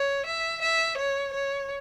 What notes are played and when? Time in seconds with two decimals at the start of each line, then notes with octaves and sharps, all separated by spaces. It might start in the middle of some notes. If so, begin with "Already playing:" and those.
Already playing: C#5
0.26 E5
0.62 E5
0.98 C#5
1.33 C#5